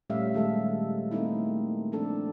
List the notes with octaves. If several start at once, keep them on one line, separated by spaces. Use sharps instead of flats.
A#2 G3 A3 C#4 E5 F5
D#3 G#3 A4 E5
A3 A#3 C4 D#4 E4
F3 C4 D4 A4